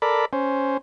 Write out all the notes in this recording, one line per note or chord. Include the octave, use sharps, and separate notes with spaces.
A4 A#4 D5 B5
C#4 C5